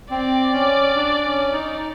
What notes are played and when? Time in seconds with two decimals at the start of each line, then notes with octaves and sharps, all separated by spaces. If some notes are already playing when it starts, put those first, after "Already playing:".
0.11 C4 D5
0.53 C#4
0.95 D4
1.24 C#4
1.52 D#4